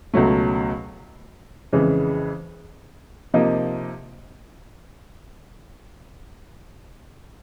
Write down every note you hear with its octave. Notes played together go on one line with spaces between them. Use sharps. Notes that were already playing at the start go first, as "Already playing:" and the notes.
C#2 B2 F#3 A3
F2 C#3 E3 G#3
C3 F3 A#3 D#4